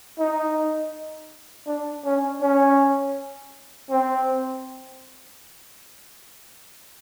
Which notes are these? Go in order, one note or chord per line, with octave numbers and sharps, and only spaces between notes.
D#4
D4
C#4
C#4
C4